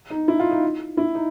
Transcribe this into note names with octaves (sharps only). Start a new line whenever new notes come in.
D#4
E4
F4
D#4
E4
D#4